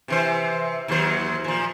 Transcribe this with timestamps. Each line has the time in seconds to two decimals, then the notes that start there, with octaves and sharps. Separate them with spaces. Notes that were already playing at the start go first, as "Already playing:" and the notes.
0.08 C3 E3 C5
0.88 D#2 F#3 C5
1.44 A#2 F3